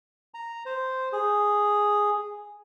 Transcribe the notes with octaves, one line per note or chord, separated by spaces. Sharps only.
A#5
C5
G#4